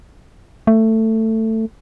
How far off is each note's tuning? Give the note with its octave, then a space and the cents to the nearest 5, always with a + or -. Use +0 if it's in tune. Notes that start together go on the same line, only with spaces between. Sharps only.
A3 +15